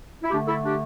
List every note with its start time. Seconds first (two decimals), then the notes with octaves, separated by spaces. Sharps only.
0.22 E4
0.31 A3 D4 G4
0.34 D3
0.47 E4 A4
0.63 D4 G4